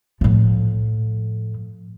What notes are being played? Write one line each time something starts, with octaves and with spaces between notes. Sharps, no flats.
A2 F3